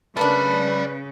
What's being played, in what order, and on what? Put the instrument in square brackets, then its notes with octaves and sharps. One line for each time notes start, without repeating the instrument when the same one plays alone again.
[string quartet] C#3 [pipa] A3 A#3 D4 [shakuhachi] B4 [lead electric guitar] D5 B5